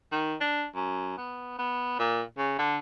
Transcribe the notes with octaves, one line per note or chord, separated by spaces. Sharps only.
D#3
D4
F#2
B3
B3
A#2
C#3
D3